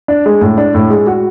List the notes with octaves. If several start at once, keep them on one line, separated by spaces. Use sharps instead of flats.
D4
G#3
A2
D4
A2
G#3
F#4